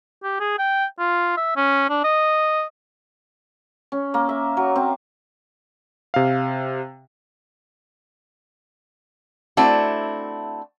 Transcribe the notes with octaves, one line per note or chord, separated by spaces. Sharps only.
G4
G#4
G5
F4
E5
C#4
D4
D#5
C#4
A#3
E5
F#3
C4
C3 F5
A3 C4 D4 E4 F#4